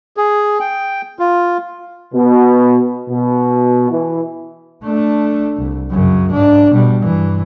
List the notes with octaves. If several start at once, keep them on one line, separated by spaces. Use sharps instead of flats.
G#4
G5
F4
B2
B2
E3
A3 D4
C2
F#2 C#3
G#2 D4
B2 G3
G2 E3